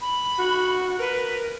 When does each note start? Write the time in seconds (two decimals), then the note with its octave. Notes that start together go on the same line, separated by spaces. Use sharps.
0.01 B5
0.39 F#4
0.99 A#4 B4